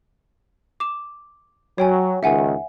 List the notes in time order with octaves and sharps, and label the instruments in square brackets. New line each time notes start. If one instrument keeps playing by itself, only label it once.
[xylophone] D6 E7
[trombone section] F#3 [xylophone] C#5 G5 G#5
[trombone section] C#2 D#3 [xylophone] E5 F#5 G#5